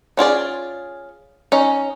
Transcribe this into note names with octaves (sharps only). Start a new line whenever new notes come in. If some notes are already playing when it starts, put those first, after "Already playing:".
C#4 F4 G#4 D5
C#4 D#4